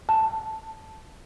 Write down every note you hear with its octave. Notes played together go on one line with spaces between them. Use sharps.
A5